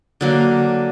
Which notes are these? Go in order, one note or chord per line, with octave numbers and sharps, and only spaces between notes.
D3 F#3 A#3